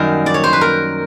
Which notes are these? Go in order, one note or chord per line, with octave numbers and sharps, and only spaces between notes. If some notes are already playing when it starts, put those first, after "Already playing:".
Already playing: F#2 D#3 G3 A#3 A#4
D5
C#5
C5
B4
A#4